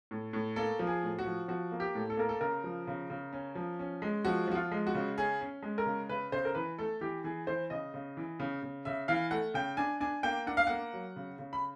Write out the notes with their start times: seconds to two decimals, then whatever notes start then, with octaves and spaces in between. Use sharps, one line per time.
0.11 A2
0.33 A2
0.56 A#3 A4
0.79 F3
0.87 G#4
1.03 A2
1.19 F#4
1.25 F3
1.48 F3 F#4
1.72 A#3
1.80 G4
1.95 A2
2.10 A4
2.17 A#3 A#4
2.29 A4
2.41 C#3 A#4
2.64 F3
2.87 C#3
3.10 C#3
3.33 C#4
3.55 F3
3.79 C#4
4.02 G#3
4.25 F3 F#4
4.47 F3 F#4
4.55 F4
4.72 G#3
4.87 F#4
4.95 C#3
5.17 C#4 G#4
5.41 C#4
5.63 G#3
5.78 A#4
5.86 C#3
6.09 C#3 B4
6.32 C#3 C5
6.45 A#4
6.55 E3 B4
6.79 A3 A4
7.01 E3 G4
7.24 E3 G#4
7.47 E3 C5
7.70 C#3 D#5
7.94 C#3
8.17 E3
8.40 C#3
8.63 C#3
8.85 C#3 E5
9.08 E3 F5
9.31 A3 F#5
9.54 C#3 G5
9.77 D4 G#5
10.00 D4 G#5
10.23 A#3 G5
10.47 D4 F#5
10.57 F5
10.67 A#3 F#5
10.93 F#3
11.16 C#3
11.39 C#3
11.53 B5